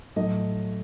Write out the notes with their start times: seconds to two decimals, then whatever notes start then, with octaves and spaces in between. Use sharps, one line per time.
0.16 A2 F#3 A3 D#5